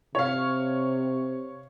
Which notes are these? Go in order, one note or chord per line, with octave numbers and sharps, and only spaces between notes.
C3 C#5 F5